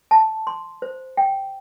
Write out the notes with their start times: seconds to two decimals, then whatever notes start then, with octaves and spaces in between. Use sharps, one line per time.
0.11 A5
0.47 C6
0.82 C5
1.17 G5